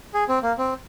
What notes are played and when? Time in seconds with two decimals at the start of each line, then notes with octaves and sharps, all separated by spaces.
0.14 G#4
0.29 C4
0.43 A#3
0.58 C4